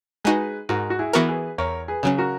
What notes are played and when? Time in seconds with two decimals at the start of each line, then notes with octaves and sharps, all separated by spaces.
0.24 G#3 D#4 F#4 G#4 B4
0.69 G#2 F#4 A#4
0.90 F#4
0.99 E4 G#4
1.13 E3 B3 F#4 A#4
1.28 G#4 B4
1.58 E2 A#4 C#5
1.88 G#4 B4
2.03 C#3 F#3 C#4
2.18 F#4 A#4